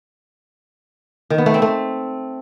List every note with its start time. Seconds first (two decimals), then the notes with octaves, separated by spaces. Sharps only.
1.30 D#3
1.38 B3
1.46 A3
1.54 C4
1.62 A3